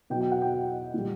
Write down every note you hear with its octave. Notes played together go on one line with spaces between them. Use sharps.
B2 F#3 G5
G5
F#5
G5
A#2 G3